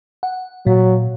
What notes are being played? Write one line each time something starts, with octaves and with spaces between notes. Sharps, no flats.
F#5
A#2 F#3